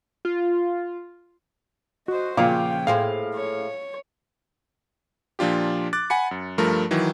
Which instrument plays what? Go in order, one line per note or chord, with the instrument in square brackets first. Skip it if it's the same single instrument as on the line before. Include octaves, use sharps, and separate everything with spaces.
[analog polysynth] F4
[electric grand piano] F#4 [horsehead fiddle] C5 D#5
[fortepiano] A#2 [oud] C#3 F3 [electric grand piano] F5 D6 [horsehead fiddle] G5
[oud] A2 G#4 C5 [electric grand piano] F5
[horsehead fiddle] C#5
[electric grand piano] A#2 F3 D4 F4 G4
D6 F#6 A6
F#5 G#5 B5 C#7
F#2
G2 F3 A3 A#4
D#3 E3 F#3